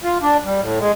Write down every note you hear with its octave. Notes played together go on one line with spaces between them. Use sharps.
F4
D4
G3
A2
G#3